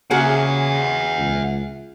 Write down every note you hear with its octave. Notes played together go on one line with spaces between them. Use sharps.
C#3 A#3 F#4 G#4 E5 F#5
C#2